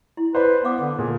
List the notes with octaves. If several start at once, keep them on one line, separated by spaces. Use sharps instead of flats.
E4
B4 C5 D5 B5
B3 F5 D6
D3
A#2 G#4